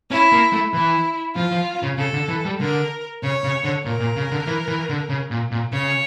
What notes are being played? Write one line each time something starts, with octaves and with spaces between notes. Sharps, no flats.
C#4 E4
A#3
A3
E3 E4
F3 F4
F3
C#3
C#3 A4
D3
E3
G3
D3 A#4
C#3 C#5
C#3
D3
A#2 A#4
A#2
C#3
D3
E3
E3
D3
C#3
A#2
A#2
C#3 C#5